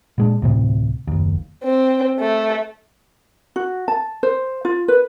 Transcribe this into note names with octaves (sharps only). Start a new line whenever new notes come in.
A#2 G#3 D4
D2 A2 C3
F#1 D#2
C4
A3
F#4
A5
C5
F4
B4